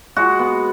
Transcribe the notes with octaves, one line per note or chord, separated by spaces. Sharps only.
G#3 F#4
B3